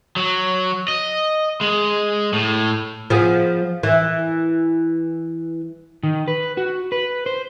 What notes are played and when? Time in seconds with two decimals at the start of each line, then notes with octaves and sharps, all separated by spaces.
0.16 F#3
0.88 D#5
1.61 G#3
2.33 A2
3.10 F3 B3 G#4
3.83 E3
6.03 D#3
6.28 B4
6.57 F#4
6.92 B4
7.26 C5